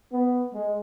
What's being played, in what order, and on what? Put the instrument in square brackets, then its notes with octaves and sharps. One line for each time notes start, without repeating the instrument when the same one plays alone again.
[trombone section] B3
G#3